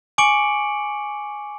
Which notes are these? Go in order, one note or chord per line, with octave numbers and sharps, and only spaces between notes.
G#5 C#6 D6 C#7 D7 F#7